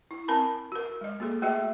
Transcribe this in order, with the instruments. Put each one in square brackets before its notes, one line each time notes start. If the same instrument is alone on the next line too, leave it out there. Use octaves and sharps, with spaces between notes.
[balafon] E4
C4 A#4 G#5 A5 B5
F#4 A#4
G#3 D#5
A#3 F#4 G#4 A4
A3 F#4 G#4 D#5 E5